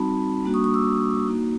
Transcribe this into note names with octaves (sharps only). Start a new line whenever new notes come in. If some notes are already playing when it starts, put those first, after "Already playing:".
Already playing: G3 C4 D#4 F#4 A5 B5
G3 A#3 D4 F#4
C#6 D#6
C#6 D#6
D6 E6
A#3 D#4 F#4